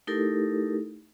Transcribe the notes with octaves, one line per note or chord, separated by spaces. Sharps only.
A3 D#4 E4 G4 A4 A#4